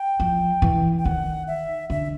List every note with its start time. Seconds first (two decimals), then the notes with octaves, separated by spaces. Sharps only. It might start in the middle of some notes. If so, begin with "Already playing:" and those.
Already playing: G5
0.20 F3
0.62 E3
0.98 G5
1.05 D#3 F#5
1.47 E5
1.90 D3 E5